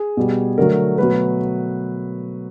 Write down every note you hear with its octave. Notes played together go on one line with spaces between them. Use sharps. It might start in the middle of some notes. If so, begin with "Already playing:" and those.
Already playing: G#4
B2 G3
D3 F#3 A3 A#4
B2 F#3 A3 B4